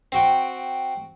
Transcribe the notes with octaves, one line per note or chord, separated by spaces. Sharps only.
C4 F#4 G5